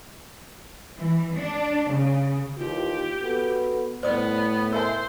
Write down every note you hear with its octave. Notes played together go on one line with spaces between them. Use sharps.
E3
D4
C#3
D#2 E3 F4 G4
B3 F#4 A4
A2 B3 C5 D5 D#6
A#4 C5 E5 G#5